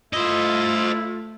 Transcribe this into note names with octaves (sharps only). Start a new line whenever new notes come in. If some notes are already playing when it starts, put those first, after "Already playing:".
A3 E4 F4 C5 D#5